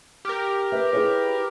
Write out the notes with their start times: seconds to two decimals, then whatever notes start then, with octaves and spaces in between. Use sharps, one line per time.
0.25 G4 A#4 F6
0.72 B4 E5
0.93 E4 G#4 C#5